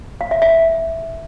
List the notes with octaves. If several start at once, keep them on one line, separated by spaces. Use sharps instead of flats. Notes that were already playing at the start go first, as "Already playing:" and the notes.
F5
E5
E5